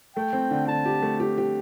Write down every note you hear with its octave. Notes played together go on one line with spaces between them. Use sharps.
A3 G5
C4
D3
D3 A5
G4
A3
G4
G4